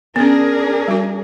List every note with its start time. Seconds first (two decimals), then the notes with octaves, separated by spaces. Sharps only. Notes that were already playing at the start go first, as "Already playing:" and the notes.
0.16 B3 C#4 D4 G#4 A#4
0.88 G3 F#4